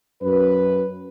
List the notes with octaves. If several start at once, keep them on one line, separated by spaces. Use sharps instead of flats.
F#2 B4